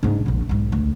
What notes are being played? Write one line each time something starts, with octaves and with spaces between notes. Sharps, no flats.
G#2 D4
E1 A#1
B1 G#2
D2